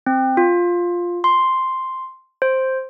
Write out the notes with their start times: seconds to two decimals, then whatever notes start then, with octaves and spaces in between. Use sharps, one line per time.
0.06 C4
0.37 F4
1.24 C6
2.42 C5